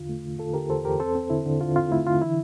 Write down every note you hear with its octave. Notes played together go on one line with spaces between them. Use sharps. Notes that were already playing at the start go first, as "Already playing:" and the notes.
Already playing: E2 D3 F4
A3
D3
D3 F4 A4
D3 G4 A#4
E2 A4 C5
E2 G4 A#4
C4 A4 C5
C4
D3 E4
D3
D3 F4
C4 F4
A3 E4
D3 F4
E3 E4